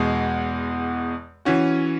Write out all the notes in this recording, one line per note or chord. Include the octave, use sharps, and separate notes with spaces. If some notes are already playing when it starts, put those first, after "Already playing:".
Already playing: E2 B2 G#3
E3 C#4 F#4